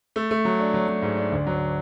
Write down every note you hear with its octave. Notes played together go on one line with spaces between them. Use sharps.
A3
A3
F#3
D4
F#3
F#3
G#2
D4
D2
F#3